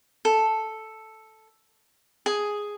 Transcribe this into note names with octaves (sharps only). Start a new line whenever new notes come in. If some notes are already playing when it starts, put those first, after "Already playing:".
A4
G#4